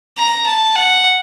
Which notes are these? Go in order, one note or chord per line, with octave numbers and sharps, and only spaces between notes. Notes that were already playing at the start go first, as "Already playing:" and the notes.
A#5
A5
F#5